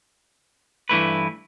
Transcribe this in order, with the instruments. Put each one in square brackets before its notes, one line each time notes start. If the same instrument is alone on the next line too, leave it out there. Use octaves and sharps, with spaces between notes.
[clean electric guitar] G2 E3 A3 E4 B4